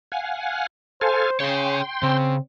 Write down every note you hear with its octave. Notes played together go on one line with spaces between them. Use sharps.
F5 F#5 G#5
A4 C5 F5 G#5
C#3 G#4 C#5 G5 C6
C#3 C4